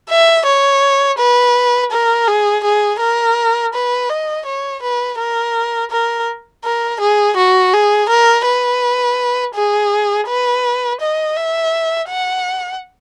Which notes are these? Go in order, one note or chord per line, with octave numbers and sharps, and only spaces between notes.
E5
C#5
B4
A#4
G#4
G#4
A#4
B4
D#5
C#5
B4
A#4
A#4
A#4
G#4
F#4
G#4
A#4
B4
G#4
B4
D#5
E5
F#5